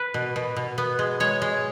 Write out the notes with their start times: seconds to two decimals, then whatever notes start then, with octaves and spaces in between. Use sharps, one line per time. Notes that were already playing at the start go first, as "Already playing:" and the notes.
Already playing: B4
0.14 B2
0.36 B2
0.56 B2
0.78 B3
0.99 G#3
1.20 G#3 C#5
1.42 G#3